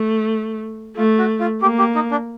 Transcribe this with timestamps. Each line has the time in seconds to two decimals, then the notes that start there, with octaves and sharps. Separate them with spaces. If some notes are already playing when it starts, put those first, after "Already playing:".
Already playing: A3
0.96 A3 F4
1.18 F#4
1.40 F4
1.62 A#3 G4
1.79 G4
1.95 D#4
2.11 D4